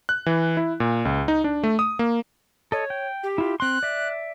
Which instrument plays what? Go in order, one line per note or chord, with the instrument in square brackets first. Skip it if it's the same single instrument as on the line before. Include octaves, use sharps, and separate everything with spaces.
[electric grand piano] F#6
E3
E4
A#2
C#2
D#4
D4
A3
D#6
A#3
[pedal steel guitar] A4 D#5 [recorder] C#5
[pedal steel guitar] G5
[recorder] G4
[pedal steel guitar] E4 F4
[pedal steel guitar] C4 C6 [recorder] F#6
[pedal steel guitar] D5 E5